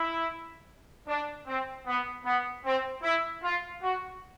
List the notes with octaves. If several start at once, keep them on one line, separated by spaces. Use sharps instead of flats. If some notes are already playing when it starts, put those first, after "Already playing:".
Already playing: E4
D4
C4
B3
B3
C4
E4
F4
F#4